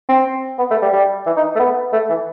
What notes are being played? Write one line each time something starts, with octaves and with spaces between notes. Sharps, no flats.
C4
B3
A3
G3
G3
E3
D#4
A3
B3
A3
E3